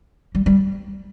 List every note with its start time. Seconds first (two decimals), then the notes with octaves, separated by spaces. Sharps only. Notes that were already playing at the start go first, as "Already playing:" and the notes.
0.35 G3
0.46 G3